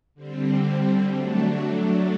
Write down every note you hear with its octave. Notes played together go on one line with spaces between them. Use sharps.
D3 G3 C4
F#3 A3 D4